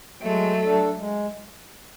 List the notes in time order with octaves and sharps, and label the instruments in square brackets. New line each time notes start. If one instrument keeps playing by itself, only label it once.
[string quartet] F#3 A3 [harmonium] G#3
[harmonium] D4 A4
G#3